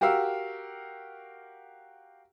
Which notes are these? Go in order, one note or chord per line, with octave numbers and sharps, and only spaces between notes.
F#4 G4 A#4 F5 E6